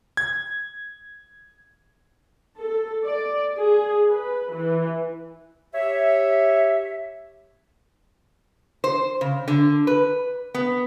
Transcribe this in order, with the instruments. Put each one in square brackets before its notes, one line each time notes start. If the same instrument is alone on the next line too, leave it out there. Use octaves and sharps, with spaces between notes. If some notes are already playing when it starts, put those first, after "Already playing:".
[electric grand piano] G#6
[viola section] A4
D5
G#4
B4
E3
[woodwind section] G4 C#5 E5
[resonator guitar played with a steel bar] C5
C#3
D3
B4
B3